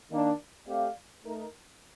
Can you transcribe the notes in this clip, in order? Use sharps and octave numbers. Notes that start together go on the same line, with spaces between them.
D#3 A#3 D4
A3 C4 G4 D5 F5
A3 D#4 A#4